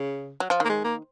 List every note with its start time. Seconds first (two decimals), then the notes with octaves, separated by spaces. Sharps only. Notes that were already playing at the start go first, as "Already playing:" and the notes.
Already playing: C#3
0.40 F#3
0.50 F3
0.60 D#3 A#3
0.69 G#3
0.84 A#3